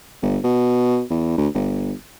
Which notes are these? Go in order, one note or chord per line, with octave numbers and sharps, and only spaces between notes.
G1
B2
E2
D2
G1